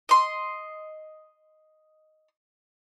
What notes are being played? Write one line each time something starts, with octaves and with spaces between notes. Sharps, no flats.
D#5 C6